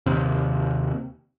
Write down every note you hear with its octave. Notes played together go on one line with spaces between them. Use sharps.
D#2 C3